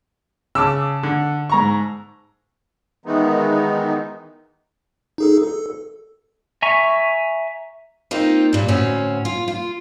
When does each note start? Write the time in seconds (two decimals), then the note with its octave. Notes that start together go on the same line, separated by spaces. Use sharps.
0.55 C#3 A5 D6 E6
1.03 D3
1.50 G#2 A#5 C#6
3.06 D#3 E3 G#3 B3 D#4
5.18 D#4 G#4 A4
5.43 A4
6.62 E5 G#5 A#5 C#6
8.11 A#3 C4 D#4 F4
8.53 G2 A#2
8.68 D2 A2 C4 C#4 F#4
9.25 F4
9.48 F4